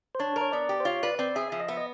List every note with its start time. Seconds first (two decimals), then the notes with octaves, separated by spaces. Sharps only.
0.15 C5
0.19 D4 C#5
0.36 A#4
0.41 C#5
0.52 B3 D5
0.69 G4
0.80 C5
0.85 F4 C#5
1.03 B4 D5
1.19 C4 D5
1.35 G#4 E5
1.52 F3 E5
1.60 D#5
1.68 B3 E5
1.77 D#5